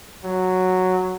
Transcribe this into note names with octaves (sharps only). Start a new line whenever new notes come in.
F#3